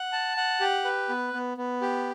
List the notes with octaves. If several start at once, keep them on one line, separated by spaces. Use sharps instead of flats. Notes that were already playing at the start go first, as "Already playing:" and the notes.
Already playing: F#5
A5
F#5
G4
B4
B3
B3
B3
G4